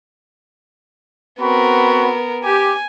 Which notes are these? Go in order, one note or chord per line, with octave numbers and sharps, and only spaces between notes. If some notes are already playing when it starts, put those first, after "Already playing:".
B3 C4 F#4 A#4 B5
G4 G#5